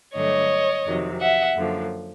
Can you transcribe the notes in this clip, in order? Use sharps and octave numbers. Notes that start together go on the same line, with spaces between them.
G2 D3 F#3 A3 C#5 D#5
F2 C3 D#3 F#3
E5 F#5
F#2 D3 F3 A#3